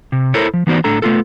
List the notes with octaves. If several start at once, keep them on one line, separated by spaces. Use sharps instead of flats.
C3
E4 A4 A#4 C5 C#5
F3
E3 B3 D#4 F#4 C5 D5
A2 D4 A4 A#5
A3 B3 F4 A4